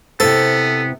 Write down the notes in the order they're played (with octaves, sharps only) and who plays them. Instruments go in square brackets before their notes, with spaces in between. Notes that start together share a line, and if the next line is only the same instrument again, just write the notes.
[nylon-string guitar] C3 E4 C5 [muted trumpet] B3 [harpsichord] A4